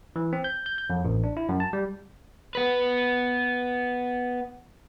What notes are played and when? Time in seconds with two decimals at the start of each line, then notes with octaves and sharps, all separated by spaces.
0.16 E3
0.33 C4
0.44 G6
0.66 G6
0.78 G6
0.90 F2
1.05 A1
1.24 D4
1.37 E4
1.49 F#2
1.60 A5
1.73 G3
2.55 B3 B4